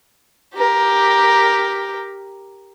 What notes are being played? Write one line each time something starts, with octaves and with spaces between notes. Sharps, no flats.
G4 A#4